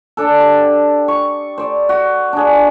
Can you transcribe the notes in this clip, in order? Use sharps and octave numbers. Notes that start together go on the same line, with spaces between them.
D4 A4
G4
C#6
C5 D5
F#4
D4 G#4